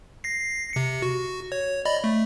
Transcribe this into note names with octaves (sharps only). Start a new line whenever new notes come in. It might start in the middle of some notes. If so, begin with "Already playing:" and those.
A#6 C7
C3 C#7
F#4
C#5
D5 D#5 B5
A3